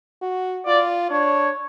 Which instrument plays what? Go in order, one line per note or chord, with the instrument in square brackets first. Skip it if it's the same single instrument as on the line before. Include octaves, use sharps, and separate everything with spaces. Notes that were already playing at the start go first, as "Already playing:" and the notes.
[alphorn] F#4
[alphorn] F4 [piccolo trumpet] D5
[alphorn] D4 [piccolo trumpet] C#5